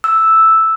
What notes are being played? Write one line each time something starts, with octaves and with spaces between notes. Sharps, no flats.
E6